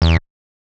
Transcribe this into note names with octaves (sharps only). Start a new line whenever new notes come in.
E2